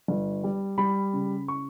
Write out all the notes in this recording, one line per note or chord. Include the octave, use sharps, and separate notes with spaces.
G1
G3
G3 B5
C#3
C#6